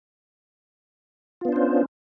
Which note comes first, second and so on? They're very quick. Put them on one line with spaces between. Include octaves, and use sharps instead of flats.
F4 B3 D4 C5 C#4